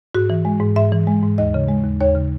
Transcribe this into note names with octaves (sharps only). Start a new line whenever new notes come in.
G#2 F#4
E3
G#3
G#2
G#2 E5
E3
G#3
G#2
D#2 D#5
C#3
G#3
D#2
D#2 C#5
C#3